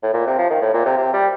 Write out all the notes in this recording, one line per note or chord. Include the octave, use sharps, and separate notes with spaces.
A2
A#2
C3
F3
D#3
A2
A#2
C3
C3
G3